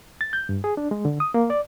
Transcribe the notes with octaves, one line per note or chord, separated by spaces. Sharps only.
A6
G6
G2
G#4
D4
G#3
D3
D#6
A#3
D5